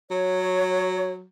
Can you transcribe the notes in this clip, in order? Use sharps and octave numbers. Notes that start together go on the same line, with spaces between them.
F#3 C#5